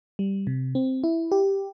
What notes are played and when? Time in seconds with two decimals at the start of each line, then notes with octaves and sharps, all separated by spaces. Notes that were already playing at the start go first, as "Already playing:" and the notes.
0.19 G3
0.47 C3
0.75 C4
1.04 E4
1.32 G4